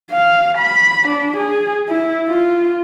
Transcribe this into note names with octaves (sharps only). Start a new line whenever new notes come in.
F5
B5
D4
G#4
E4
F4